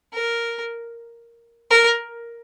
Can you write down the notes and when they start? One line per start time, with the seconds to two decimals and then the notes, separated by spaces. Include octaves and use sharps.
0.13 A#4
1.70 A#4